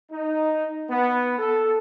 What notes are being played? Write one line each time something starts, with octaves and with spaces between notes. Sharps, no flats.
D#4
B3
A4